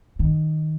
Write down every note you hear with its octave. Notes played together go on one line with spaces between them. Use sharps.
D#3